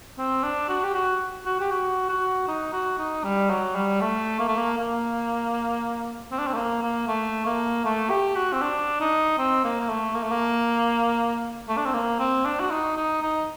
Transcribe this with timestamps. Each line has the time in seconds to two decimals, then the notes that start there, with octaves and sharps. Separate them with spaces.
0.18 C4
0.44 D4
0.69 F#4
0.84 G4
0.94 F#4
1.46 F#4
1.61 G4
1.71 F#4
2.09 F#4
2.48 D#4
2.73 F#4
2.99 D#4
3.24 G3
3.50 F#3
3.76 G3
4.01 A3
4.40 A#3
4.48 A3
4.58 A#3
4.78 A#3
6.32 C4
6.39 D4
6.47 C4
6.53 A3
6.57 A#3
6.83 A#3
7.08 A3
7.46 A#3
7.85 A3
8.10 G4
8.36 F#4
8.53 C4
8.62 D4
9.01 D#4
9.38 C4
9.64 A#3
9.81 A#3
9.90 A3
10.15 A#3
10.23 A3
10.32 A#3
11.69 A3
11.77 D4
11.86 C4
11.94 A#3
12.20 C4
12.45 D4
12.60 F#4
12.70 D#4
12.97 D#4
13.22 D#4